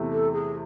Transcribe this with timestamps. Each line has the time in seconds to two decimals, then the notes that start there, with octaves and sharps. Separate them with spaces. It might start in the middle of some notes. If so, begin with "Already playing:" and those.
Already playing: E2 C3 E3 A3
0.12 A4
0.33 G#4